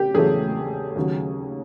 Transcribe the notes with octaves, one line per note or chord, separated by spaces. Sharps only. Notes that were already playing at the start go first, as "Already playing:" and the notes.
Already playing: C#3 G4
E2 C#3 F#3 A3 G#4
D#2 C#3 F#3